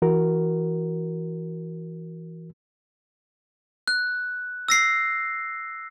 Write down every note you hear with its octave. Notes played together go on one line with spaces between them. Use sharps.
E3 F#4 A#4
F#6
E6 A#6 C7